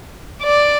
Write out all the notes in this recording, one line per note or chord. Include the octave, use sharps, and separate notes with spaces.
D5